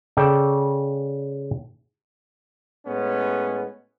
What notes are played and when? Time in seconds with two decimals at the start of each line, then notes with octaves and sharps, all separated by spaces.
0.17 C#3 A4 D5 G5
2.86 A2 G#3 B3 C#4